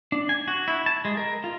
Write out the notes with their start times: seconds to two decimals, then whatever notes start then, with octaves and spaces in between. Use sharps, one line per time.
0.12 D4
0.29 G#5
0.48 F#4
0.68 E4
0.86 A5
1.05 G#3
1.17 A#4
1.44 F4